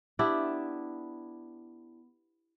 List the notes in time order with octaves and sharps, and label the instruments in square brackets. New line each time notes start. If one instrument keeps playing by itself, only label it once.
[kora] B3 D4 E4 G4